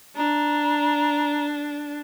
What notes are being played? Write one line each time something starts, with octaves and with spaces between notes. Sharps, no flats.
D4 A#5